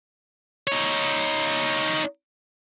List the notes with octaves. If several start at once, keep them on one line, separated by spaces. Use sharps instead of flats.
D#4 C#5